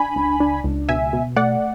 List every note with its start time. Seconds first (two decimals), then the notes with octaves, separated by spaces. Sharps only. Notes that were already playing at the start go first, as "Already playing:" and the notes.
Already playing: D4 G#5 B5
0.16 C#2
0.40 D4
0.64 C#2
0.89 B2 E5 G#5
1.13 B2
1.36 A3 D5 F#5